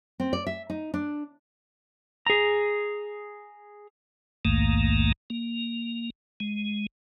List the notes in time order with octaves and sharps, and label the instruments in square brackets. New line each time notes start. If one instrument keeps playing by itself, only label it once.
[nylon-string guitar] C4
D5
E5
D#4
D4
[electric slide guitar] G#4 A#5
[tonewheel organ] A#1 D#2 G#2 D#3 A3 A#3
A#3
G#3